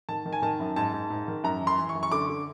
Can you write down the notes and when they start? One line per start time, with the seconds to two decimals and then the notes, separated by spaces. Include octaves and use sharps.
0.09 D#3 A5
0.26 D#3
0.33 G#5
0.42 D#3 A5
0.60 F#2
0.76 G#2 A5
0.93 G#2
1.10 G#2
1.28 D#3
1.44 F#2 A#5
1.61 E3
1.67 C6
1.78 E3
1.89 C#6
1.95 F#2
2.03 C#6
2.12 D3 D6
2.29 D3